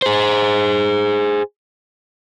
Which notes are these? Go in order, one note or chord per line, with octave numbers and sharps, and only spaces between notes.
G#4 C5